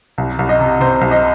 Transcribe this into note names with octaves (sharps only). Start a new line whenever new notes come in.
C2
C2
D#5
C3
C3 C5
C2
D#5